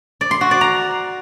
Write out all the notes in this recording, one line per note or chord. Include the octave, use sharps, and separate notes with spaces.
D5
C6
F#4
D5
A#5